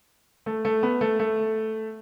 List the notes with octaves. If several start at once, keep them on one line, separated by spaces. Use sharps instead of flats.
A3
A3
B3
A3
A3